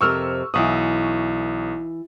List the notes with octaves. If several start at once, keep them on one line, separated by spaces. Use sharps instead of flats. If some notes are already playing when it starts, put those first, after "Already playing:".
F2 C3 A#4 C#6 E6 F6
B1 E3 F#5 C#6 D#6